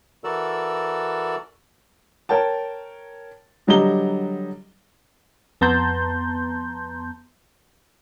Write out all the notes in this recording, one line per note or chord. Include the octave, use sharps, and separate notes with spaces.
E3 F#4 A4 A#4 D5 E6
A#4 C#5 G5 A5
D3 F#3 G3 D#5 A#5 G7
F2 B3 A5 A#5 C6 G6